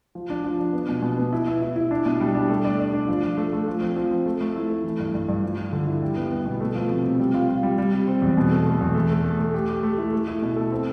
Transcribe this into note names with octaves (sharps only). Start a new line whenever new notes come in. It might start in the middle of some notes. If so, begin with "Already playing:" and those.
F3
D4
F3
D4
B3
B2
B2
B3
E4
E4
E4
E4
D4
B2
G3
D4
A3
D5
D5
D4
F3
F3
A3
A3
F3
C4
F3
C4
A3
A3
E4
A3
E3
G2
G2
G2
F3
F3
D3
E4
G3
B3
B3
B2
A3
F3
C3
C3
G3
F4
F4
G3
G3
C3
C4
E2
B2
A3
A3
E2
A3
A3
A4
A3
G4
G4
A3
E4
A3
E4
B2
A4
C4